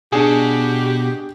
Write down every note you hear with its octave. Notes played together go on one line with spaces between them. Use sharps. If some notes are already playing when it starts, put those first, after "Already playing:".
B2 D4 G4 G#4